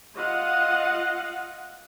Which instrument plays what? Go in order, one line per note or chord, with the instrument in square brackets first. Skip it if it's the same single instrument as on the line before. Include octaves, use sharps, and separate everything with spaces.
[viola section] F4 D#5 F5 F#5